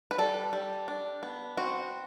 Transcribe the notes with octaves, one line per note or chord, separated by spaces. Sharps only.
B4
G3 A4
G3
D4
B3
C4 F#4